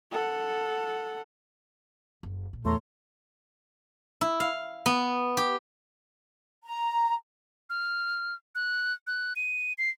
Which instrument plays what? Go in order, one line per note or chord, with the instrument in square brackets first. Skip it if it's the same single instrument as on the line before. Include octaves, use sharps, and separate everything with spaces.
[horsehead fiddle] A4 F#5
[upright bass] F#1
A#2
[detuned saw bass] E2 [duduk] A3 [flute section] C#5 A#5 C6
[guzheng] E4
F5
B3
G4
[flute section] A#5
[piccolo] F6
F#6
F#6
D#7
C7